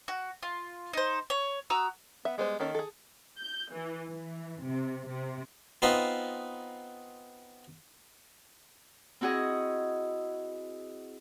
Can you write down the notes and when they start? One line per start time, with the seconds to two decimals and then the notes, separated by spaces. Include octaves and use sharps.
0.08 F#4
0.43 F4
0.93 D#4 C5
1.30 C#5
1.70 F#4 A#5 D#6 E6
2.25 B3 E5
2.38 G3 G#3 B3 C5
2.60 D#3 A#3 C#4 A4
2.75 G#4 A4
3.41 G6
3.74 E3
4.11 E3
4.66 C3
5.10 C3
5.82 B3 C4 D#4 F4 B4
9.21 C4 E4 F#4 G#4 D#5